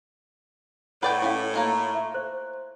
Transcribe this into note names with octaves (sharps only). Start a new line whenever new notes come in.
A2 B4 D5 F#5 G5
C#4 E4 F#4 F5
A#3 F4 C#5
E5
C5